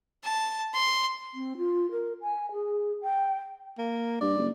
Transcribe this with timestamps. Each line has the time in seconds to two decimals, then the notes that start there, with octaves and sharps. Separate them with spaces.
0.24 A5
0.73 C6
1.34 C4
1.58 F4
1.91 A#4
2.21 G#5
2.52 G#4
3.02 G5
3.78 A#3
4.21 G2 D5
4.37 F#1